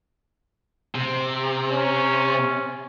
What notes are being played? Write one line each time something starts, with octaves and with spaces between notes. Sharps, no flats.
C3
C#4